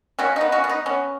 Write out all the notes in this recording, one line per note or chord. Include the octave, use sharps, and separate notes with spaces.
C#3 C#4 F#4
D#4
B3
C#4 F#4
B3
D#4
B3 C#4